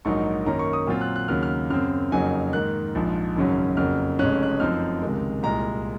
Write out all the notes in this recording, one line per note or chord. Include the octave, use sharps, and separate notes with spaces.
A#1 G#2 F#3 A#3 D#4 C#6
F#2 D#3 A#3 C#4 A#5
C#6
D#6
A#2 F#3 C4 F4
F#6
F#6
D#2 C#3 F#3 A#3 F6
F6
F#2 C#3 F#3 C4 F6
F2 C#3 F#3 A#3 D#4 G#5
G#2 D#3 A#3 F#6
A#1 G#2 F3
G#1 F#2 C#3 F#3 C#4
F2 C#3 F#3 A#3 F6
F1 F2 C#3 G#3 C#4 F#6
F#6
F#2 F3 C4 D#4 F6
C#2 C3 D#3 G#3
C2 A#2 G#3 A#5